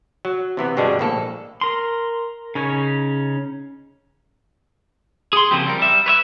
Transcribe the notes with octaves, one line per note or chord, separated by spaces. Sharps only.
F#3
C3 E3 B3
G2 B2 D3 G3 G#3 D4
A#1 A2 A#3 A4
A#4 C6
C#3 C#4 D#4 C#5
G#4 C6
C#3 F3 F#3 A#3 C4 G4
G3 A#4
G3 E5
B4 C#5 E5